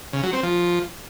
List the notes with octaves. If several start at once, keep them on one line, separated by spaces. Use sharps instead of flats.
C#3
F#3
C4
F3